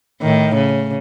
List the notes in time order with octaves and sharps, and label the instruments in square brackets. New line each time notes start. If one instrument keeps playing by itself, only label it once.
[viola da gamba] A2 D#3
C#3